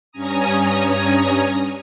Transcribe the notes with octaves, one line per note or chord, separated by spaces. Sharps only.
G2 C#4 G#5 A#5 D#6